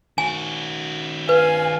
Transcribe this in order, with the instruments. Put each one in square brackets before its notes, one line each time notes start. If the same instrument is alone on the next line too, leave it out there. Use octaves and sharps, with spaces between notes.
[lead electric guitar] D#3 F#4 [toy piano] G#5
[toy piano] B4 [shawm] F5 [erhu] G#5